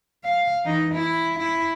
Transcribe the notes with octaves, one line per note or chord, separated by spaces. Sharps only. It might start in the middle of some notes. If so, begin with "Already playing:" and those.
F5
E3 D#4
E4
E4